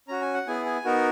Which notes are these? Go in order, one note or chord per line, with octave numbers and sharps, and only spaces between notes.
C#4 F#4 A#5
G#5
F#5
B3 E4 G#4 G#5
G#5
B3 D#4 F#4 A#4